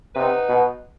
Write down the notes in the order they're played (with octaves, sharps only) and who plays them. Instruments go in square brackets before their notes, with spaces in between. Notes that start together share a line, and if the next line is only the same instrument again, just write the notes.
[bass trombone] C3 [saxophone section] B3 D#4 B4
[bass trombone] B2